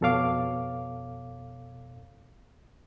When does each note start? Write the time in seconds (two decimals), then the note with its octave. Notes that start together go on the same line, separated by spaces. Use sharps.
0.01 F2 B2 A4 C#5 F5 D6